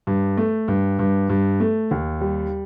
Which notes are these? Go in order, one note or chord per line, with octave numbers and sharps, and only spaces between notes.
G2
A3
G2
G2
G2
A3
D#2
G3